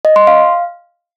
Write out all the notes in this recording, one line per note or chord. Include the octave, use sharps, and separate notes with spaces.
D#5
C6
F5